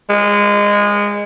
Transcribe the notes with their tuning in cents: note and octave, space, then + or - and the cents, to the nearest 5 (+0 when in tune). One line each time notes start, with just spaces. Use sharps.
G#3 -20